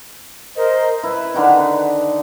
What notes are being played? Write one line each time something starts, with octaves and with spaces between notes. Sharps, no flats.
A#4 C5 D#5
E4 B4
D3 D#3 D#4